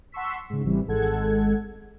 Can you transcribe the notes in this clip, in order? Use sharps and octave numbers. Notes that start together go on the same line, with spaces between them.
F#5 A5 C6 C#6 E6 B6
G#2 C#3
A1 C3 E3 G3
G#1 G#3 A4 F#5 G#6